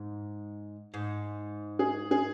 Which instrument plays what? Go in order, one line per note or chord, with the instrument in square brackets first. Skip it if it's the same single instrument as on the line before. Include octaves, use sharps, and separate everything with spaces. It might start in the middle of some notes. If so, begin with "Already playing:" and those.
Already playing: [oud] G#2
G#2
[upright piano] G#4
G#4